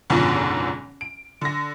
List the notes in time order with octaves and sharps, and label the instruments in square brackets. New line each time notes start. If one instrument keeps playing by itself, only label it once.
[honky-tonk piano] F#1 B1 G#2 B2 D3 F3
D7
D3 A#6